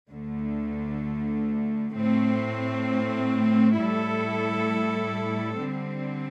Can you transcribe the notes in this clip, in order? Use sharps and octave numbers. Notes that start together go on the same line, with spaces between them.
D2 D3 A3
A2 A3 C4
A2 G3 E4 A4
D3 G3 C4